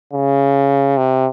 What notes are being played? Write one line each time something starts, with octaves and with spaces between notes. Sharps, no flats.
C#3
C3